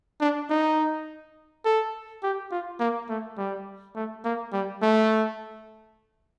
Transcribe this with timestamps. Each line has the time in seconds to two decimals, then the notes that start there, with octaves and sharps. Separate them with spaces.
0.21 D4
0.50 D#4
1.65 A4
2.23 G4
2.51 F4
2.80 A#3
3.09 A3
3.38 G3
3.96 A3
4.25 A#3
4.53 G3
4.82 A3